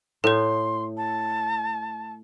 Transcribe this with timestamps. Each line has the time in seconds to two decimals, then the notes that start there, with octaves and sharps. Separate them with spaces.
0.24 A2 A4 C#5 C6
0.97 A5